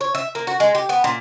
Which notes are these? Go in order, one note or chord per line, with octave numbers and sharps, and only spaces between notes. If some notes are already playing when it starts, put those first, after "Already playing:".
C#5
E5
A#3
F#4
G#3
G4
B3
A#2